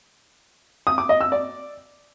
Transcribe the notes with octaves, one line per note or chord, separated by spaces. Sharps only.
D#6
D6
D#5
E6
D5